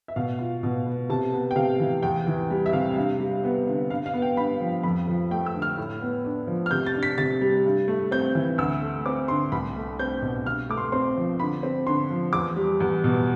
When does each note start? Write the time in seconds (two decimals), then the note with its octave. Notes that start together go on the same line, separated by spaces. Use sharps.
0.08 E5
0.16 B2 F5
0.39 F4
0.63 B2
0.86 B3
1.09 C3 A5
1.33 B3
1.51 G5
1.56 C3 F5
1.80 E3
2.03 E2 G5
2.27 E3
2.51 G3
2.66 E5
2.73 C3 F5
2.97 G2
3.20 G3
3.44 B3
3.67 D3
3.90 G2 F5
4.06 F5
4.13 B3
4.22 G5
4.37 G2 B5
4.60 F3
4.83 F2 B5
5.07 F3
5.31 A3 G5
5.46 E6
5.54 D3
5.62 F6
5.77 A2
6.01 B3
6.25 D4
6.47 F3
6.66 F6
6.71 C3 G6
6.86 A6
6.95 D4
7.03 B6
7.18 C3 A6
7.42 G3
7.65 G2
7.88 A3
8.12 C4 G6
8.35 E3
8.58 D2 E6
8.81 A3
9.06 C4 D6
9.28 D3 C6
9.52 C2 B5
9.76 A3
9.99 C4 G6
10.22 B2
10.45 G2 F6
10.69 A3 D6
10.77 C6
10.92 C4 C6
11.16 F3
11.40 D3 B5
11.63 C4
11.87 D3 C6
12.10 F3
12.33 E2 D6
12.56 G3
12.80 E2
13.04 B2